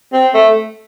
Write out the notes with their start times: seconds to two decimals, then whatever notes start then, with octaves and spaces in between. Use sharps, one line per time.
0.13 C4
0.34 A3